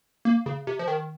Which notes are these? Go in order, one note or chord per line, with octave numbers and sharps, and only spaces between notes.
A#3
C#3
C3
F3
D#3